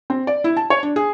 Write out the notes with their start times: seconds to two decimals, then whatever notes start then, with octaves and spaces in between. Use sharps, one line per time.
0.10 C4
0.27 D5
0.44 E4
0.57 A5
0.70 C#5
0.83 D4
0.96 G#4